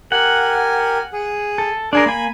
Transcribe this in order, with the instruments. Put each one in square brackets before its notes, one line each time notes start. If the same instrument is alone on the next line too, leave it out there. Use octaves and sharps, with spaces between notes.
[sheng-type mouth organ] G4 A#4 G#5 [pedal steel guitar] F#5
[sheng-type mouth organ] G#4
[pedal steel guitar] A4
[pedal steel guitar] D4 G#4 A#4 [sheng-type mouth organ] D5 C6
[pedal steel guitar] A#3 G#5 [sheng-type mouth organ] B5